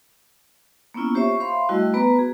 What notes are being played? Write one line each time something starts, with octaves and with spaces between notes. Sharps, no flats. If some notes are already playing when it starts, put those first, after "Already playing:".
A#3 B3 C#4 E4 F4
G4 C5 C#5 E5 C#6
C5 E5 F5 B5 C6
G3 A3 E4 F#4 D#5 E6
B3 B4 A#5
F#4 G#4